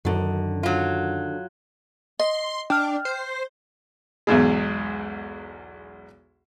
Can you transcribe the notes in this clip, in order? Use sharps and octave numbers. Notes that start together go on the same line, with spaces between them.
F#2 D3 D#3
F#3 F4
D#5 C6
D4 G5 F6
C5
B1 E2 G#2 G#3